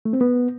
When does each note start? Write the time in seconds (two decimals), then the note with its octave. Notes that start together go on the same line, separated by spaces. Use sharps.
0.05 A3
0.13 C4
0.21 B3